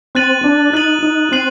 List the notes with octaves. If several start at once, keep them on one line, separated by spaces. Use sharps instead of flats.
C4 F#6 A6 D#7 F#7
D4
D#4 F#6 A6 D#7 F#7
D#4
C4 F#6 C7 D#7 F#7